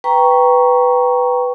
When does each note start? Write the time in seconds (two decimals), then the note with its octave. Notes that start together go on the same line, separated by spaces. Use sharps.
0.04 B4 G5 A#5 C#6